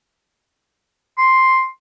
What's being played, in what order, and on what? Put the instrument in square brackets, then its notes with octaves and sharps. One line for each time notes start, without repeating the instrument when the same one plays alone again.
[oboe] C6